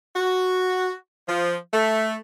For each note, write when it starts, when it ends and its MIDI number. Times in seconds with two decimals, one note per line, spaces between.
0.16 0.92 66
1.29 1.56 53
1.74 2.16 57